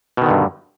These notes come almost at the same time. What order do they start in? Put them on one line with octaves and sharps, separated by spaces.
B2 D#3 D3 G2